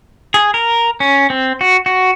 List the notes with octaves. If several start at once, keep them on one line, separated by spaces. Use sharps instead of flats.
G#4
A#4
C#4
C4
F#4
F#4